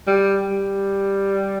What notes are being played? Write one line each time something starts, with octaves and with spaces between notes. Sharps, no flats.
G3
G3